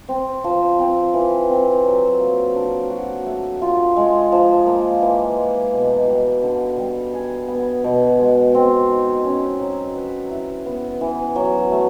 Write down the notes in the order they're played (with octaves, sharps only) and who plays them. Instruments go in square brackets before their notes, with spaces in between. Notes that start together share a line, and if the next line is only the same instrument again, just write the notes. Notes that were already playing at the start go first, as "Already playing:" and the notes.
[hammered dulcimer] C4
F3
C4
E3
C4
F#3
A#3
D4
F#4
A3
F4
G#3
F3
A#3
E3
G#3
B2
G3
D3
G3
G#4
B3
B2
G#3
C4
D#4
C#4
F#3
B4
E4
B3
E3
F#3
A3